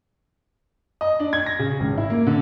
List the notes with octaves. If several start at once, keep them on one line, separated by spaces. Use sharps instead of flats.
D#5
D4
G#6
A#6
C#3
G#1
E4
A#3
D3